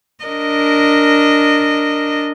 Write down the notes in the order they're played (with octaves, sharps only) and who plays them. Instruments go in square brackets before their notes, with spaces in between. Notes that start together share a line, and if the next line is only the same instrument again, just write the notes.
[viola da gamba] D4 A#4 D#5